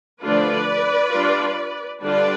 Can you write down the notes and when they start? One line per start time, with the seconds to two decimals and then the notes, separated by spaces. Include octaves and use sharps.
0.22 D3 F3 A3 D4 F4 B4 D5
1.13 G3 D4 F4
2.02 D3 G3 D4 F4 B4 D5